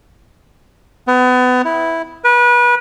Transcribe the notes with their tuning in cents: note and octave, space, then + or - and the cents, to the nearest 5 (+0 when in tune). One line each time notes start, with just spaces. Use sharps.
B3 +30
E4 -5
B4 -30